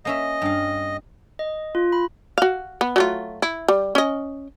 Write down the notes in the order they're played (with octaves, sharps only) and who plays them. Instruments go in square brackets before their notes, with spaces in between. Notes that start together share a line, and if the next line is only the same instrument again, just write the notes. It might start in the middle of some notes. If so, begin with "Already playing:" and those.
[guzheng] A#3 C#4 E5 [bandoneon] D#5
[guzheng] G2 F5
[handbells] D#5
F4
B5
[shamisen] F#4 F5
B3
F#3 A3 F4
E4
G3
C#4 D#5